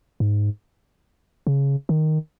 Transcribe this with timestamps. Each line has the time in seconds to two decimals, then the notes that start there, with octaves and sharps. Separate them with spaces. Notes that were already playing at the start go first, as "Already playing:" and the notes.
0.20 G#2
1.47 C#3
1.89 D#3